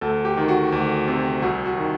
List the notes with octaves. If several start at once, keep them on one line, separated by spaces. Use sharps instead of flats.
D2 A4
G4
D#3
F#4
D2
C3
C2 F#4
F#4
D#3